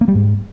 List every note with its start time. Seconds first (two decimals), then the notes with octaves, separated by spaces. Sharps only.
0.01 A#3
0.08 G3
0.15 G#2